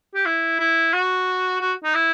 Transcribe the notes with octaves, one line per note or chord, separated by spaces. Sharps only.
G4
E4
E4
F#4
F#4
D#4
E4